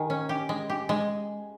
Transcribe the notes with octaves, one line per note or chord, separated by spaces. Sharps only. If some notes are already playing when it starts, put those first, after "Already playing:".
Already playing: D#3 G#5
C#4
G4
G#3
G4
G#3